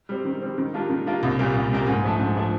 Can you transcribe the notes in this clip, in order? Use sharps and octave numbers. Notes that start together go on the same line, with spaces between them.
G3 C4
D#3
G3 C4
D#3
G3 A#3 D4 F4
D#3
G3 A#3 D4 F4
C2
A#2 G3 A#3
C2
A#2 G3 A#3
G#2
F3 A3 D4
G#2
F3 A3 D4